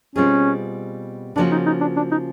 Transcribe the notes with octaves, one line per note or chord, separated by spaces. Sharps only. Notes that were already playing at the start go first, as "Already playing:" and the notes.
B2 G3 C4 C#4 F4 G#4
C#3 F3 A#3 C#4 D4 F#4
D#4
D#4
D4
D4
D#4